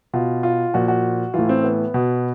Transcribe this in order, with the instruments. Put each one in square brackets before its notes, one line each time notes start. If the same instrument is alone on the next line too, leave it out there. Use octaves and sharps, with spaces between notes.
[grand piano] B2 F4
F4
A#2 F3 F#4
F#4
A2 E3 F4
C4
B3
B2